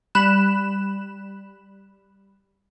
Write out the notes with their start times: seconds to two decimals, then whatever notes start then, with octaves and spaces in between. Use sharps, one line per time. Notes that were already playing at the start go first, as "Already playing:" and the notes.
0.15 G3 B5 F#6 E7